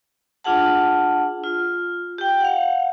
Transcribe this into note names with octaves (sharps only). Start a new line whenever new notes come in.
D4 F4 G#4 F#5 A5
F4
G4 G5
F5 F#5